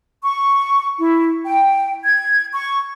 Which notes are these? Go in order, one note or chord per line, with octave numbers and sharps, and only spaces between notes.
C#6
E4
G5
G#6
C#6